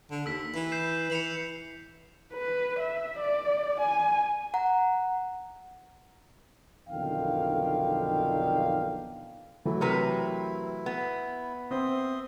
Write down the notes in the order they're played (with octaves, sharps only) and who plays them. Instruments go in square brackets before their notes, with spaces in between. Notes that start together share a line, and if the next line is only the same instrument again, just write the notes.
[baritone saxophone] D3
[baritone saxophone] D#2 [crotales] E6 B6
[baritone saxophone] E3
[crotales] G6 C7 E7
[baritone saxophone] E3 [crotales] C#7 F7 F#7
[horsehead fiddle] B4
E5
D5
G#5
[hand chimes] F#5 A#5
[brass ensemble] B1 F2 D3 D#3 F5 G5
[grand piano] E3 F#3 A3 [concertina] E4
[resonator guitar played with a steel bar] C3 A#4 B4
B3
[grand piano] C4 C5 [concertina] E5 C6 D#6